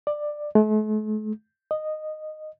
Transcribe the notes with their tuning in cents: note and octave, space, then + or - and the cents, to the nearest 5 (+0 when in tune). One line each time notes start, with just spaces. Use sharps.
D5 +15
A3 -45
D#5 -10